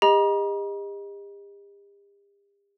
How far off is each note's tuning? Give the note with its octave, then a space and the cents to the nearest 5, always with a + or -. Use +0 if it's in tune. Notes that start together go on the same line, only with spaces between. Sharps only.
G4 +40 D#5 +0 A#5 +45